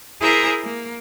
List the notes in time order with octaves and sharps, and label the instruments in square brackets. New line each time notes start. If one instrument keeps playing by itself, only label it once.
[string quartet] E4 G#4 A#4 C5 E5 A#5
A#3